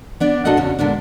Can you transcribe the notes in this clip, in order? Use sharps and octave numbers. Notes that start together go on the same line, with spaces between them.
B3 D4 D5
A#2 D4 F#4 A4 D#5 F#5
E2 C#3 C#4 F#4
A#2 D3 G#3 B3 D4